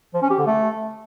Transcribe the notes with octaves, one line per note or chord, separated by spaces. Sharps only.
F3
C#4
G4
D3
A3